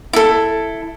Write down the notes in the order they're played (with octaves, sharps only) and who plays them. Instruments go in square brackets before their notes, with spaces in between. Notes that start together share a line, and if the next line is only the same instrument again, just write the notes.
[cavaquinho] E4 A4